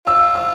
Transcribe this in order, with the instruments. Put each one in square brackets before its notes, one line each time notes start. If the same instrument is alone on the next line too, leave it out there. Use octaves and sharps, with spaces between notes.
[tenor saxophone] F4 [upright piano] E6
[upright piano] E6